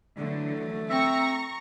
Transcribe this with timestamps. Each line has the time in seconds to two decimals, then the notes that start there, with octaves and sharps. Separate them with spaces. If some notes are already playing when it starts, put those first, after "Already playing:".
0.19 D3 E3 F#3 A3
0.90 C4 E5 A#5 C#6 A#6